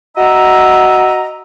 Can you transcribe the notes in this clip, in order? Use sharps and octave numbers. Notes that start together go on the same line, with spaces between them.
F#4 D#5 E5 A#5